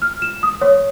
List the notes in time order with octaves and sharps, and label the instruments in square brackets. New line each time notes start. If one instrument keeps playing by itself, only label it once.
[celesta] F6
E7
D#6
C#5